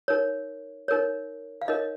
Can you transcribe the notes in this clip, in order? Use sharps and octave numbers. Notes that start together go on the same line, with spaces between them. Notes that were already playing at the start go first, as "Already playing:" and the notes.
D#4 A#4 C#5
D#4 A#4 C#5
F5
D#4 A#4 C#5 D#5